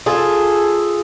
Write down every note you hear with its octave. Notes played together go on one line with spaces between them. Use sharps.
F4 G#4 A4